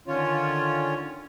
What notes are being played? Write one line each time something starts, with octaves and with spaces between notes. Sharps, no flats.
D3 D#3 C#4 F4 C#5